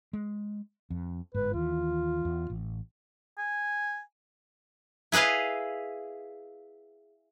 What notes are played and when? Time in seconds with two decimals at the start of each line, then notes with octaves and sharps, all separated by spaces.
0.13 G#3
0.90 F2
1.34 G1 G#2 B4
1.53 D#2 E3 F4
2.25 E2
2.50 A1
3.38 G#5
5.12 E4 G#4 B4 D#5 F5